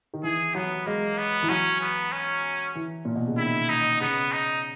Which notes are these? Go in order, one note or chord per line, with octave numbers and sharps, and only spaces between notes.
D#3
E3 G#4
F#3 B3
G#3 A#3
B3
E3
F#3 C#4
B3
C#4
E3
A#2
B2
C#3
D#3 E4
D#4
C#3 B3
D#4